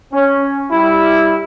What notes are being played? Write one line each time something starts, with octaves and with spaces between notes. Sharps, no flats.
C#4
G3 E4